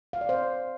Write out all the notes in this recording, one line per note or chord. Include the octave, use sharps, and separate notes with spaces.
F5
D5
C5